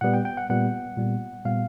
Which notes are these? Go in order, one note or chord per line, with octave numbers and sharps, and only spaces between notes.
A#2 G3 B3 F#5
G5
G5
F#5
A#2 G3 B3 F#5
A#2 G3 B3
A#2 G3 B3 F5